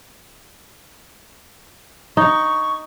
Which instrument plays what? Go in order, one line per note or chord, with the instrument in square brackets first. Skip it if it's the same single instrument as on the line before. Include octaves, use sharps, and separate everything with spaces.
[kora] D#4 [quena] C#6